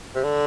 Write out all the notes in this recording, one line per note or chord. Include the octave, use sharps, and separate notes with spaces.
C3
D3